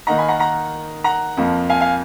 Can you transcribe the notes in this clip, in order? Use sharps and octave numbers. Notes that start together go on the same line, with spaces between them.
D#3 A#3 D#4 F#5 A#5
G#5 B5
F#5 A#5
F#5 A#5
F#5 A#5
F2 F3 A#3
F5 G#5
F5 G#5